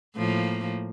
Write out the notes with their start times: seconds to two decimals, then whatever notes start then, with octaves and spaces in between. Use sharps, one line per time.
0.16 A2 F3 A#3